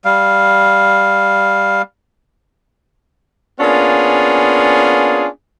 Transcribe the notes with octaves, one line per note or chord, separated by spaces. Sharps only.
G3 F5
A#3 B3 C#4 D4 F4 G#4